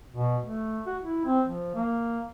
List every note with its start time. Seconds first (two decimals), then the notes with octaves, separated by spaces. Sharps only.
0.12 B2
0.44 A3
0.86 F#4
1.02 E4
1.25 C4
1.46 F3
1.75 A#3